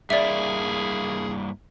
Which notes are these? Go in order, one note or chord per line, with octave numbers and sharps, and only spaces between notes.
G2 A#3 E4 G#4 D5 E5